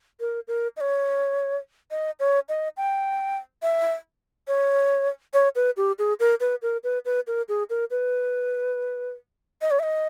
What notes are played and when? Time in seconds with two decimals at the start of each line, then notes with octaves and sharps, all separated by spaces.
0.20 A#4
0.48 A#4
0.77 D#5
0.81 C#5
1.91 D#5
2.20 C#5
2.49 D#5
2.77 G5
3.62 E5
4.48 C#5
5.34 C#5
5.56 B4
5.77 G4
5.99 G#4
6.20 A#4
6.40 B4
6.62 A#4
6.84 B4
7.05 B4
7.27 A#4
7.48 G#4
7.70 A#4
7.91 B4
9.62 D#5
9.71 C#5
9.79 E5
9.83 D#5